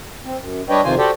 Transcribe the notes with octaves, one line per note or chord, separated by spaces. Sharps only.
C4
F#2
G3 D4 B4 C#5 D#5 G5
F2 C3 D#3 F4 C5 G#5
F#4 G4 A4 C5 D5 G5